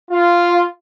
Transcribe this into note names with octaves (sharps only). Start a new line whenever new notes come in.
F4